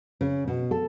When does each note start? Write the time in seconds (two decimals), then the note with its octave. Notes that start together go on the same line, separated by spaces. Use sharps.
0.21 C#3
0.48 B2
0.71 A4